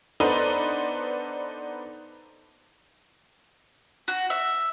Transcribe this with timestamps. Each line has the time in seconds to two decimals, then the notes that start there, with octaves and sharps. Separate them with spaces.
0.20 B3 D4 D#4 A4 B4 C5
4.08 F#4
4.30 E5